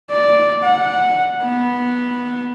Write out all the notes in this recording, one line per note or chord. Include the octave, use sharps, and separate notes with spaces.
D5
F#5
B3